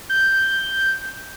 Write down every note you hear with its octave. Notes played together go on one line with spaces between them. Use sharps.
G6